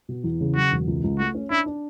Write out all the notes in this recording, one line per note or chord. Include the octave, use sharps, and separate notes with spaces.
B2
E2
C#3
F#3 F#4
E1
C#2
C#2
A3 F#4
C#4
D4 E4
D4